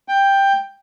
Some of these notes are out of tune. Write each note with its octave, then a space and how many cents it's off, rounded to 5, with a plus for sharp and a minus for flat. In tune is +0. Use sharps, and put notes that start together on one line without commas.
G5 +10